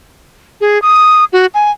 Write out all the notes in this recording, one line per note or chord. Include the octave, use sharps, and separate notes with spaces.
G#4
D#6
F#4
G#5